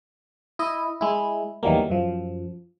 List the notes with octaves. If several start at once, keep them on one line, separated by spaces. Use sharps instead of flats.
E4 D#5
G#3 E4
E2 D#3 E3 F#3 G3 A#3
F#2 F3